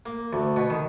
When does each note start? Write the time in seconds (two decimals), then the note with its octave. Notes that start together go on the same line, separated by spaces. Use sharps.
0.06 A#3
0.33 D2
0.56 B2
0.70 D#3